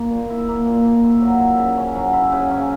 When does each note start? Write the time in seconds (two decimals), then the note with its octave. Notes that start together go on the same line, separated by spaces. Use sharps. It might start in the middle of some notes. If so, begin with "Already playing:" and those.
Already playing: A#3
0.10 A#2
0.30 E4
0.48 A#3
0.67 A#2
0.85 A#2
1.04 E4
1.21 F#3
1.39 E4
1.58 C#3
1.77 C#4
1.95 F#3
2.13 E4
2.32 C#3
2.51 C#4